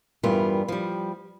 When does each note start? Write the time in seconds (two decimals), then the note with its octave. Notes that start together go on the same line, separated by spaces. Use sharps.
0.23 E2 G2 G3 B3 F4 A#4
0.68 F3 G3